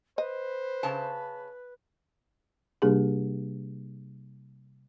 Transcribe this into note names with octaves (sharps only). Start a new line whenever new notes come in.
B4 C5 D#5
C#3 A5
C3 G3 A#3 D4 G4 G#4